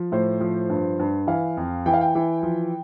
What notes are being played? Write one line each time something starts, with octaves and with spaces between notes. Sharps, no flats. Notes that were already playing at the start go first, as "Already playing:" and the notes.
Already playing: F3
A2 C5
F3
G2
G2
E3 F5
F2
E3 G5
F5
G5
E3
F3